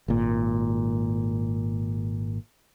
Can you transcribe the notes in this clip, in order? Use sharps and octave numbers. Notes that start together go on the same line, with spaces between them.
G#1 A#2